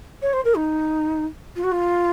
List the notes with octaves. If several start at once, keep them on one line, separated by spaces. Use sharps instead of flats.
C#5
C5
A#4
D#4
F4
F#4
F4